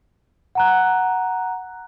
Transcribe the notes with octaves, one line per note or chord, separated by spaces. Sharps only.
F#5 A#5 F#6